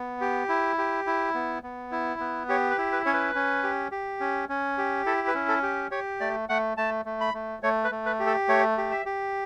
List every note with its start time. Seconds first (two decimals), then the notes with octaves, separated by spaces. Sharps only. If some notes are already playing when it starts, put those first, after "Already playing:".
Already playing: B3
0.21 G4
0.49 E4
0.78 G4
1.07 E4
1.34 B3
1.63 B3
1.92 E4
2.20 B3
2.49 G4 C#5
2.71 B4
2.78 E4
2.92 B4
3.06 C#4 C#5
3.13 B4
3.35 C#4
3.63 G4
3.92 G4
4.20 C#4
4.49 C#4
4.78 G4
5.06 E4 A4
5.28 B4
5.35 C#4
5.48 A4
5.63 G4
5.91 G4 C#5
6.20 A3 D5
6.49 A3 F#5
6.77 A3 A5
7.05 A3
7.21 B5
7.34 A3
7.63 A3 C#5
7.84 B4
7.91 A3
8.06 B4
8.20 G4
8.27 A4
8.48 A3 C#5
8.78 G4
8.91 E5
9.06 G4